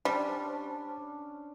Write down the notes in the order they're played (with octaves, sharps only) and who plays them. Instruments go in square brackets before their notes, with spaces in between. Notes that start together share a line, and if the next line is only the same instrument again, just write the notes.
[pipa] G3 [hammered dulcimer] C#4 D4 [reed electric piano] C5 A5